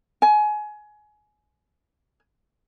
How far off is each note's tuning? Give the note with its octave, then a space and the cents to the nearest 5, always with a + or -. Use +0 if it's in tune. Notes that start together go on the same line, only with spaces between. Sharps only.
G#5 +25